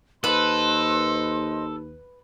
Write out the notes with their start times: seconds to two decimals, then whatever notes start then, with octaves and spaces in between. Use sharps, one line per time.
0.24 D#2 A4 B4 C5 D#5 C6